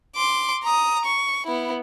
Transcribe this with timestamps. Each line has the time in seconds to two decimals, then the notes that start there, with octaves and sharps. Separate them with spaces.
0.16 C6 D6
0.63 A#5 D#6
1.05 C#6
1.46 B3 E4